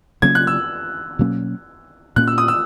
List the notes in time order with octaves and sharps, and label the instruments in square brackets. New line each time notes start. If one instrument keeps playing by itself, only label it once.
[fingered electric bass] C#3 F#3 A#3 C#4 [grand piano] G#6
[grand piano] F#6
E6
[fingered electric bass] B2 F#3 A#3 C#4
[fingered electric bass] A#2 A#3 C#4 [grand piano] F#6
[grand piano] E6
D#6
E6